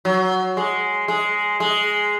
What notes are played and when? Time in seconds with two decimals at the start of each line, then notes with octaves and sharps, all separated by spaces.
0.05 F#3
0.57 G#3
1.08 G#3
1.60 G#3